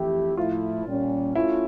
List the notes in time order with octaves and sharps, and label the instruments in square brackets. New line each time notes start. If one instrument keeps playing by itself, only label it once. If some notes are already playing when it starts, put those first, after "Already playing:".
Already playing: [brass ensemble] F2 E3 A3 E4 G4
[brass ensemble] A2 F3 A3 E4 [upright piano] F4
[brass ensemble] A#2 G3 C#4
[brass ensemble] A3 C#4 F4 [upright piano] E4